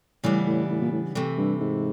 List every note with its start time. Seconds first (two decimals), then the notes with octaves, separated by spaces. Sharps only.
0.24 A2 C#3 E3 G3 B3 D4
0.46 A2
0.70 A2
0.81 A#2
0.92 A2
1.15 C3 E3 A3
1.37 G2
1.60 G#2